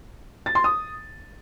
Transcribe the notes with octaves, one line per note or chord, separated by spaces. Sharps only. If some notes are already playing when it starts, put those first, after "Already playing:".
A6
C6
D#6